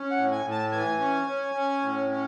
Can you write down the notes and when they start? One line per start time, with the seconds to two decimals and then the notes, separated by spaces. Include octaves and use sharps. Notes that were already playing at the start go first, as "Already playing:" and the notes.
Already playing: C#4
0.11 F#5
0.17 A2
0.32 G#5
0.45 A2
0.51 A5
0.72 E3 G#5
1.00 C#4
1.27 C#4
1.54 C#4
1.82 A2
2.10 C#4